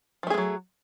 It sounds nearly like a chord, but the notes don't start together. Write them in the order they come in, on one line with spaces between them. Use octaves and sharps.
F3 A3 G#4 G#3 F#3